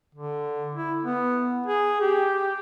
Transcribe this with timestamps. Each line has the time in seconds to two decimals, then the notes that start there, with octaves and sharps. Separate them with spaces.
0.15 D3
0.75 E4
1.03 B3
1.66 G#4
2.01 G4